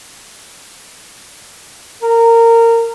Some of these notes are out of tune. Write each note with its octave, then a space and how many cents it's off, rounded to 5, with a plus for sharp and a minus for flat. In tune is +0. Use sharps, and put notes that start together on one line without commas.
A#4 -20